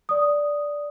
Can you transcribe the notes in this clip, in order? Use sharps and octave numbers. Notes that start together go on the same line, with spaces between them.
D5 D#6